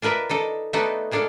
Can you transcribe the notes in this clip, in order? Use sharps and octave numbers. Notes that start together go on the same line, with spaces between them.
D4 F4 A#4 B4 E5
D4 D#4 A4
A3 B3 D4 D#4 F#4 A4
A#2 G#3 D4 A4 F5